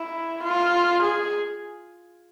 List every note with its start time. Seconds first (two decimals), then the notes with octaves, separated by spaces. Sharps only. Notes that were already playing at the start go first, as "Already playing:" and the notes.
Already playing: E4
0.43 F4
1.03 G#4